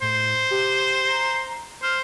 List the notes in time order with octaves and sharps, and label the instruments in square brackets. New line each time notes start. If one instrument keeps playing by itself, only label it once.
[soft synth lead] A2 [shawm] C5
[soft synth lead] G4
A#5
[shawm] C5 [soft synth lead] F6